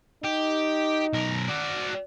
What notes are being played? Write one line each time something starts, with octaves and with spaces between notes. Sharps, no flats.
D#4 G4
B1 A#4
F#4 D5